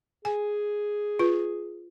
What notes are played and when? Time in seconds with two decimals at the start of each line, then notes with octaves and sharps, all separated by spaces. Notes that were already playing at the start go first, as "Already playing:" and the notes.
0.25 G#4 G#5
1.19 F4 B4